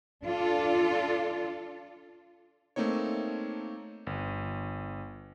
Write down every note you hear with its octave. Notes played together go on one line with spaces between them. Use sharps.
D4 F4 A4
A3 A#3 C4 D#4 C#5
G1